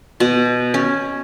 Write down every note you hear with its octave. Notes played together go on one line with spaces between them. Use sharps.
B2
C#4